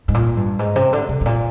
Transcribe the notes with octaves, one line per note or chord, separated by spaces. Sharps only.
G#2
A#2
G2
G#2
C3
D3
C3
G#2
A#2